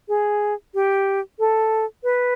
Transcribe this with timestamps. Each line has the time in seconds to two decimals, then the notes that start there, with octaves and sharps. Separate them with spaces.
0.08 G#4
0.74 G4
1.39 A4
2.04 B4